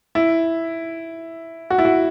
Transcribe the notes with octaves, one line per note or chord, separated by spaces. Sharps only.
E4
F#4
E4
F#4